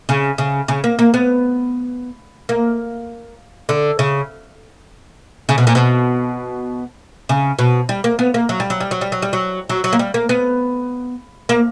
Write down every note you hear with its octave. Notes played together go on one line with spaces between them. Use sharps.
C#3
C#3
C#3
A#3
A#3
B3
A#3
D3
C#3
C#3
B2
A#2
B2
C#3
B2
G3
A#3
B3
A#3
F#3
G3
F#3
G3
F#3
G3
F#3
G3
F#3
F#3
F#3
A#3
G3
A#3
B3
A#3